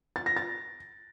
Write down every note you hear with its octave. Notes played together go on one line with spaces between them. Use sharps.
A6
A#6
A6